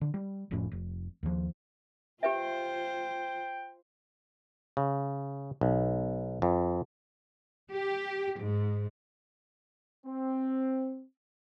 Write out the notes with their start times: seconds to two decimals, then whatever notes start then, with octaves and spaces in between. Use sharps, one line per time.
0.01 D3
0.14 G3
0.51 F1 F2 A2 C#4
0.72 F1
1.23 D#2 F3
2.23 F4 G4 B4 C5 E5 G5
4.77 C#3
5.61 B1
6.42 F2
7.71 G4
8.42 G#2
10.06 C4